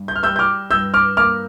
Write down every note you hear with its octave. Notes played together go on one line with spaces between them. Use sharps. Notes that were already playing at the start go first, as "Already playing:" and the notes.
Already playing: G2
G6
F6
G3 E6 G6
G6
D6 F6
G2 E6 G6
D6 F6
A#3 D6 F6